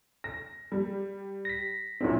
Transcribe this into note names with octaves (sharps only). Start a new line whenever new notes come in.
A#6
G3
A#6 B6
A#2 F#3 C4 D4 E4